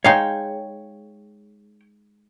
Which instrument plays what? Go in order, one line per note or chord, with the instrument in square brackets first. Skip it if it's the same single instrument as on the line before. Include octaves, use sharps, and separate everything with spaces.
[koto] G#3 D#4 F5 [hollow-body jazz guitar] C#5 G5